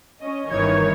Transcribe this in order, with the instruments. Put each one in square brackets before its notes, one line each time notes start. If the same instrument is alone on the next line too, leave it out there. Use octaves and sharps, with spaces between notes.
[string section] C#4 D#5
[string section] G1 D#3 G#6 [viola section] E3 D#4 C#5